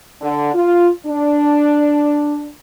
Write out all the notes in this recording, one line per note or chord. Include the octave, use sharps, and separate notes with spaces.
D3
F4
D4